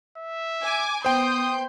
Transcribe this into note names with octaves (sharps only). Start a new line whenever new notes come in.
E5
G#5 D6
B3 C5 G5 C6 D#6 G6